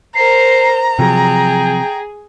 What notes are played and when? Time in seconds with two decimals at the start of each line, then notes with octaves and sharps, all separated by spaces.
0.15 A#4 C5 A#5 C7
0.99 C3 F3 F#3 G#4 G5